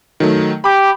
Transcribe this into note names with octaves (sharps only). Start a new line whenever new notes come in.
D#3 F#3 A3
G4 B5 D6